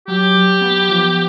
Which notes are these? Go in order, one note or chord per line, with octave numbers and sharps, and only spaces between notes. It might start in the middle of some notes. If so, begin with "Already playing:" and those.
F#3 G4
F#3
B3
F3